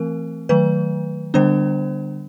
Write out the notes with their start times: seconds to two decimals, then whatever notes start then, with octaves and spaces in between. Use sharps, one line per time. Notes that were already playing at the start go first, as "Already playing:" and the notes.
Already playing: E3 A3 C4 A#4
0.49 D#3 F#3 A3 B4
1.34 D3 G3 B3 D4 C5